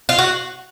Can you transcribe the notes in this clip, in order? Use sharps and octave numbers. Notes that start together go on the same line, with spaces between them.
F4
F#4